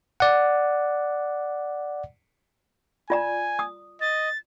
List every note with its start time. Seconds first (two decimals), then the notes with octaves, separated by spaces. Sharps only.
0.20 D5 F#5
3.10 F4 D5 G#5 A#5
3.59 D#6
4.01 D#5 A6